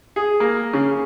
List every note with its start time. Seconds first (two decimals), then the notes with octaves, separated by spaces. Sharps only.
0.16 G#4
0.40 A#3
0.73 C#3